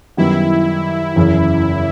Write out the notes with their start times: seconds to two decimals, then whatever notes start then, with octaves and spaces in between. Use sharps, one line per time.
0.17 F#2 D#3 G3 B3 E4
1.16 F#1 E2 C#3